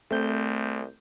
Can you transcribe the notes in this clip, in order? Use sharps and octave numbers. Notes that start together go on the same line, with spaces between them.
C2 A3 C4 G6